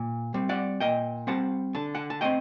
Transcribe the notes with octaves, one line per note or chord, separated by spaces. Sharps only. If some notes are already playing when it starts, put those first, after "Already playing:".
Already playing: A#2
G3 C4
D5 F#5
A#2 D#5 G5
G3 C4 F#5 A5
D3 A5
F#5 A5
A5
A3 C4 D#5 G5